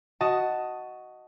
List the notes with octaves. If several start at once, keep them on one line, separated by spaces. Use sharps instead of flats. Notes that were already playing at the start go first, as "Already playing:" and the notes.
F#4 D#5 A5